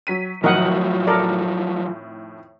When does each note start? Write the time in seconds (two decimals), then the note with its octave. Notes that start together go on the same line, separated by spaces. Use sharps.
0.07 F#3 B6 D#7
0.44 F2 A2 D#3 F3 F#3 A#4 D#5 F#5
1.07 A4 A#4 D5